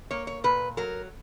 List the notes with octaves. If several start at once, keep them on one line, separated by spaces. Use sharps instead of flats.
A#3 C#5
C#5
A#2 B4
F#3 A#4